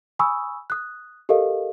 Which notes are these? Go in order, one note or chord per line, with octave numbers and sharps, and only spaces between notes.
G#5 B5 C#6 D#6 E6
D#6 F#6
G4 A4 A#4 D#5 F5